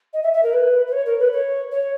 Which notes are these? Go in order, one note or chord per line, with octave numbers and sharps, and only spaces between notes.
D#5
E5
E5
A#4
B4
B4
C#5
A#4
B4
C#5
C#5